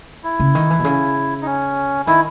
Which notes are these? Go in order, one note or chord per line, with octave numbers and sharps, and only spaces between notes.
E4
C#3
D#3
E3
B2
C#3
D#4
C#4
D#3 E4